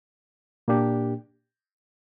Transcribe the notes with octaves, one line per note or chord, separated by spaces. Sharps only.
A#2 A#3 D4 G4